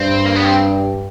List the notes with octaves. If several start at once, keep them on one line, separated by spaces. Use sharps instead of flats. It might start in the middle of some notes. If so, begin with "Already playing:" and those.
Already playing: G2 C4
A#3
B3
C4